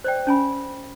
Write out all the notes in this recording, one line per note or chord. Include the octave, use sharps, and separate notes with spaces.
C5 D5 G5
C#4 G#5 B5